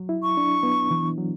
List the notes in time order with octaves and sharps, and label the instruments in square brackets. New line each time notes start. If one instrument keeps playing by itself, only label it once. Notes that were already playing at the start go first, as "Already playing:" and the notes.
Already playing: [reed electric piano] F#3
E4
[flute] C#6
[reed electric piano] D4
B3
E3
F#3